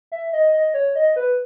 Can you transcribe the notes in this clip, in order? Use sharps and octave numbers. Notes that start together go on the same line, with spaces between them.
E5
D#5
D#5
C#5
D#5
B4